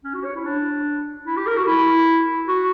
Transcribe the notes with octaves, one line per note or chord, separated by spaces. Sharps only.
C#4
F#4
C#5
E4
D4
E4
G4
A#4
F#4
E4
F#4